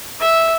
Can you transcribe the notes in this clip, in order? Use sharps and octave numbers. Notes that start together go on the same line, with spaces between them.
E5